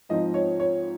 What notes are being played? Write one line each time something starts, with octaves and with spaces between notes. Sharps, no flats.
G#2 F3 C4 D#4 D#5
C#5
C#5